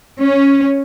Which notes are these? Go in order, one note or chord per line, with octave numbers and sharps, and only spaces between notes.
C#4